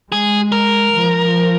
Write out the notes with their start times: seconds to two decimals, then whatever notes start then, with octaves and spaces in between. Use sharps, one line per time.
0.12 G#3 G#4
0.52 A#4
0.92 F3